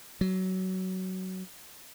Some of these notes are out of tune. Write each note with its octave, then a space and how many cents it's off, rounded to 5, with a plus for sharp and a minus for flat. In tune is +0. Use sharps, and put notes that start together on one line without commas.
F#3 +15